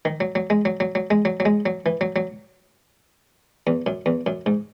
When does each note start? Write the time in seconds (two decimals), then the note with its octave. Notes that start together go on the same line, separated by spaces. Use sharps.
0.05 D#3
0.20 F#3
0.35 F#3
0.50 G#3
0.65 F#3
0.80 F#3
0.95 F#3
1.11 G#3
1.25 F#3
1.40 F#3
1.45 G#3
1.66 F#3
1.86 E3
2.01 F#3
2.16 F#3
3.67 E2
3.86 F#2
4.06 E2
4.26 F#2
4.46 G#2